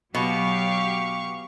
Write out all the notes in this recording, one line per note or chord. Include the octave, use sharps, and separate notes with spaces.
B2 F#3 G4 F5 C#6